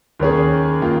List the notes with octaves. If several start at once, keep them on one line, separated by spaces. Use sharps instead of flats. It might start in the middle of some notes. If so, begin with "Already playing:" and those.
D#2 D#3 C#4 G#4
D#3 A#3 F4